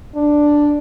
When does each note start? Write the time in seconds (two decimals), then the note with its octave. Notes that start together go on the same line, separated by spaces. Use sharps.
0.16 D4